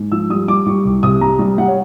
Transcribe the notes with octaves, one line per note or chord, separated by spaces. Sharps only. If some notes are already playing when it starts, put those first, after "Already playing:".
Already playing: G#2
F3 E6
G3 D#6
G3 D6
G3 C#6
C2
C3 D#6
G3 A#5
G3
G3 F#5
C#5